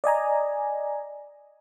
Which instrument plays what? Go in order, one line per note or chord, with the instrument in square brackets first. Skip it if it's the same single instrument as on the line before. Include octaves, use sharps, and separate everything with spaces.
[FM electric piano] D5 D#5 G#5 A#5